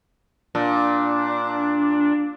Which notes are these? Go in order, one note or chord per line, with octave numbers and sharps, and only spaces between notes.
A#2 D4